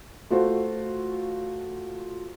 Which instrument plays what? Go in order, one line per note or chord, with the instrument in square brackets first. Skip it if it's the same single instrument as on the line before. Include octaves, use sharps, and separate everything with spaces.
[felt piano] A3 F4 F#4 C5